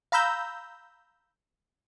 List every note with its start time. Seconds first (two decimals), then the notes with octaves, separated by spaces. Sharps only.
0.12 F5 A#5 B5 E6 G6